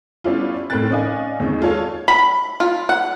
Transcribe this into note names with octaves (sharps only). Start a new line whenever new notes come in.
G3 B3 C#4 D4 E4 F4
A2 C4 A#4 G5 F#6 A6
C#4 D#4 D5 D#5 F5 G#5
D#2 G#3 C4 D#4
G#3 F4 A4 C#5 F5
B5
F4
F#5